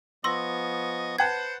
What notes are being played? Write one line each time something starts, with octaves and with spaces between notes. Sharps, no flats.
F3 B3 D#5 C6 C#6 E6 A#6
B4 C5 F#5 A5 G#6